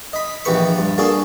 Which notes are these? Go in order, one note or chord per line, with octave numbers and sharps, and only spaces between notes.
D#5 B5
A#1 E3 G4 B4 C#6
G2
A#3 D4 F#4 G#4 A4